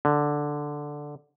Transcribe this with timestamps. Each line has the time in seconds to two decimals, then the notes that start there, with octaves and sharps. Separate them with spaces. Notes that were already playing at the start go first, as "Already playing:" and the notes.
0.05 D3